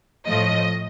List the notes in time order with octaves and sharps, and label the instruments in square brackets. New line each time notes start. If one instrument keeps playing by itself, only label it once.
[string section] A2 F3 A3 D#5